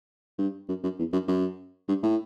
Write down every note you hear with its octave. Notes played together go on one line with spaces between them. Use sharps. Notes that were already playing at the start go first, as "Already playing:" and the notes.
G2
F#2
F#2
E2
F#2
F#2
G2
A2